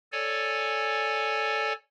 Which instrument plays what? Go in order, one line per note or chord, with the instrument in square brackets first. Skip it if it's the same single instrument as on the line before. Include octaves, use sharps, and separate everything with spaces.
[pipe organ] A4 C#5 D5 G#5